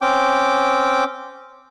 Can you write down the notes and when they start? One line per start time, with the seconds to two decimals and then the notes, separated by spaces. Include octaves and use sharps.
0.02 C4 C#4 G5 D6